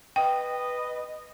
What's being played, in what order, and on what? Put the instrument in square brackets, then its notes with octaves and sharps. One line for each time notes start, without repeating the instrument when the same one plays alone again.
[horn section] B4 D#5 [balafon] G5